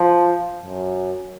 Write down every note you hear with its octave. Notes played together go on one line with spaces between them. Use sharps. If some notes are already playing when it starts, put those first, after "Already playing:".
Already playing: F3
F#2